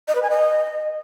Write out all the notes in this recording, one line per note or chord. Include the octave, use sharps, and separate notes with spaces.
D#5
B4
G#5
D#5